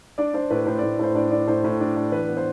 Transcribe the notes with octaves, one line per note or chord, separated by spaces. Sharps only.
D4 D5
D4 C5
A2 B4
A2 C5
A2 D5
A2 C5
D4 D5
D4 D5
A2 C5
A2
D4
D4
E3 B4
B3
C5